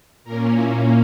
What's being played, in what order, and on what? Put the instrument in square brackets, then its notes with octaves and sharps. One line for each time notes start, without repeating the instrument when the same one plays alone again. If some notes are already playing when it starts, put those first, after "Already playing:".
[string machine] A#2 A#3 C#4 A#4
E4